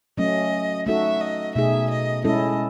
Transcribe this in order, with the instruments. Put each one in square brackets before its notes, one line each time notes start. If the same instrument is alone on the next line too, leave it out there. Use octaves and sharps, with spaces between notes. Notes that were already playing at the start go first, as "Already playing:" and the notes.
[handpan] F#3 A3 C#4 [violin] D#5
[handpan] A3 D#4 F#4 A4 [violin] E5
[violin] D#5
[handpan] B2 A3 D#4 G#4 [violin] E5
[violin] D#5
[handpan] G#3 C#4 E4 A4 [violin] D#5